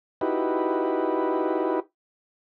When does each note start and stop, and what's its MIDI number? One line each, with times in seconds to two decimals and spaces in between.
0.21 1.80 63
0.21 1.80 64
0.21 1.80 66
0.21 1.80 67
0.21 1.80 71